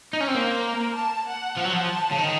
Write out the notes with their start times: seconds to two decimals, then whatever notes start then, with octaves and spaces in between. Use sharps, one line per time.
0.13 D#4
0.21 C#4
0.28 C4
0.35 A#3 C5
0.65 A#4
0.96 A5
1.27 F#5
1.57 F3
1.65 F#3
1.73 F3
1.88 A5
2.11 C#3
2.19 D#3